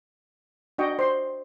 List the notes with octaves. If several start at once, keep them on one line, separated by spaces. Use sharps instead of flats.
D4 F#4 D#5 G5 C#6
C5 C6